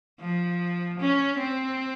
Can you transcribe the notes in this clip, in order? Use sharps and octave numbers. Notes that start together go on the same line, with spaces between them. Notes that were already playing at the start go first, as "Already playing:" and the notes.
F3
C#4
C4